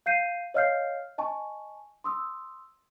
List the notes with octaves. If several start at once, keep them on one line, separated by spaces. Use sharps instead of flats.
F5 G6 C7 D#7
C#5 D#5 F5 F6 G6 C7
D#5 G#5 A5 C#6
C6 D#6 E6